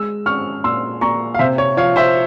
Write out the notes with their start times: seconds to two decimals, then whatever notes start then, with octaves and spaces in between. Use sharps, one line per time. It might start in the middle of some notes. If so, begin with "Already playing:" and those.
Already playing: G#3 E6
0.26 C#4 C#6 F6
0.64 A#2 C6 E6
1.01 A#2 A#5 C#6
1.34 F5
1.39 C3 C5 E5
1.58 C#5
1.77 F3 C#5 F5
1.96 C5 E5